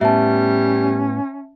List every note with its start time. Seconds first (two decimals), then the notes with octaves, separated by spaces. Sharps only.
0.01 A2 G3 B3 C#4 E5 A5